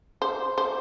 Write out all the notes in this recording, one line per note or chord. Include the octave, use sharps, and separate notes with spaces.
C5
C5